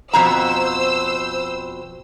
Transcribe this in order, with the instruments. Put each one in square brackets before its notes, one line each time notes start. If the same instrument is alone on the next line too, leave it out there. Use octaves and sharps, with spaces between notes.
[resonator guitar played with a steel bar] F2 B2 A#5 [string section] C5 E6